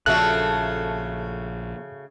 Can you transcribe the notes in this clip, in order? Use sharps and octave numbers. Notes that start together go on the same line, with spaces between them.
A#1 C#3 F3 A3 F#4 A4 E5 F#6